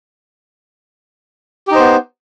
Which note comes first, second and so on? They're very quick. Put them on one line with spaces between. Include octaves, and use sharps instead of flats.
G4 D#4 C5 B3